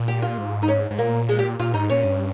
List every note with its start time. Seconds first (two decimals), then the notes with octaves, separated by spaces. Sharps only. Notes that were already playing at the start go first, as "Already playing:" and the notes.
Already playing: A#2
0.08 G4
0.22 F4
0.38 G#2
0.63 D#4
0.68 C#4
0.91 G#2
0.98 A#2 A#3
1.29 G#3
1.39 G4
1.60 A#2 F4
1.74 G#2 D#4
1.90 A#2 C#4
2.04 G2